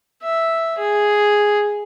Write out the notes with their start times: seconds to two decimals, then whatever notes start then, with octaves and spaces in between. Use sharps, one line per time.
0.23 E5
0.78 G#4